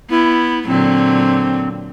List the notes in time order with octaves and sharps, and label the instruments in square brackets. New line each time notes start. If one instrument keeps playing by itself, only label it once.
[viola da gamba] B3 [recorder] E4
[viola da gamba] A#2 D3 F#3 [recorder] C4